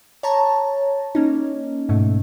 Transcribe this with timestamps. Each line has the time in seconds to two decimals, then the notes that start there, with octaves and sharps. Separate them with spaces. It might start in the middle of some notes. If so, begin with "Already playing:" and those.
0.23 C#5 A5 A#5
1.15 A#3 C#4 D#4
1.89 G#2 B2 A3